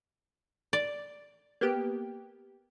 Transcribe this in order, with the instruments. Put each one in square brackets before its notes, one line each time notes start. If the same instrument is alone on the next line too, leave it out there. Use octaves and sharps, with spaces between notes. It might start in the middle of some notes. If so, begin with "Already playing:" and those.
[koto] D5
[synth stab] A#3 B3 G4